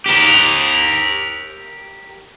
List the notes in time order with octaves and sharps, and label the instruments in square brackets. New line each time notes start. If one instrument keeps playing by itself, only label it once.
[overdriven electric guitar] G4 A#4